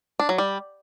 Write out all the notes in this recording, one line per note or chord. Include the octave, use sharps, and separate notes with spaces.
D4
F#3
G3